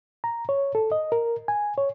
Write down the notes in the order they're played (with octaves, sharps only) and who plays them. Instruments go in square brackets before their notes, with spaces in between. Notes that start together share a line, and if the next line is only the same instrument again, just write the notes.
[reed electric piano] A#5
C#5
A4
D#5
A#4
G#5
C#5